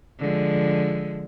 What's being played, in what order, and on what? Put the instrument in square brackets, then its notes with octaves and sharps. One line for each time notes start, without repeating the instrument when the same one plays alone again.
[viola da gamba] D3 F3 G#3